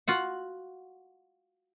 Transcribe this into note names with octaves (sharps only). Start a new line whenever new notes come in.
F4 F#4 F#5